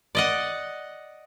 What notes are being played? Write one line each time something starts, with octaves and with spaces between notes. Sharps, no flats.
D5 D#5 F#5